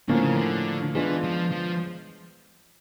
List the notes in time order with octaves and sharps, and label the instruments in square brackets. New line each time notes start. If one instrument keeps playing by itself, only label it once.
[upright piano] A2 F3 A#3 C#4 [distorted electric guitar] D3
[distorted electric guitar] C#3
D3
[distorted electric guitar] E3 [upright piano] G#3 B3 D4 F4
[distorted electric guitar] F3
F3